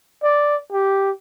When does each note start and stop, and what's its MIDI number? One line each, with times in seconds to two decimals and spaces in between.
0.23 0.56 74
0.72 1.11 67